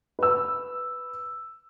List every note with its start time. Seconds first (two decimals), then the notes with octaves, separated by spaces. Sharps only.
0.19 B4 E6